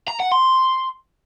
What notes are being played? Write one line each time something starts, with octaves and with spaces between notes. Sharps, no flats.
A#5
F#5
C6